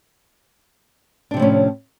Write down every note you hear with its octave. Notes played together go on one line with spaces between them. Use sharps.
A2 C3 F3 C#4 D4